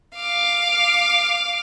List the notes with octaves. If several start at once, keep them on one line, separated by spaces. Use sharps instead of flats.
F5 D6